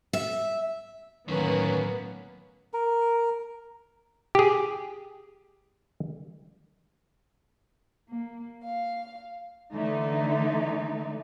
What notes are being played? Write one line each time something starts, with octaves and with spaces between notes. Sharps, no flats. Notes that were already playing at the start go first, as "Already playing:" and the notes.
E5
D2 A2 D#3 F#3 A#3 B3 C#4 B4
A#4
G4 G#4
A#3
F5
D3 E3 A3 D#4